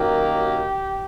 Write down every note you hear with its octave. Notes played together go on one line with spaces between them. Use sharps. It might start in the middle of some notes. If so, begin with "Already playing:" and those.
Already playing: F#2 D#3 F#3 A#3 G4